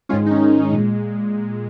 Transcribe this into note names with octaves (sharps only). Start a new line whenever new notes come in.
G#2 D#3 G#3 C#4 F4
D#4
C#4
A#2 G#3